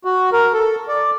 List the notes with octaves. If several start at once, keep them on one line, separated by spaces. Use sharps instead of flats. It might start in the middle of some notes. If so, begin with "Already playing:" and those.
F#4
A#4
A4
D5